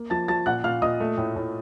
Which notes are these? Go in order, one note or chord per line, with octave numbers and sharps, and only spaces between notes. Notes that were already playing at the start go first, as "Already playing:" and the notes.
Already playing: A#3
F3 A5 A6
F3 A5 A6
A#2 F#5 F#6
A#2 F5 F6
A#2 D#5 D#6
A3
A2
A2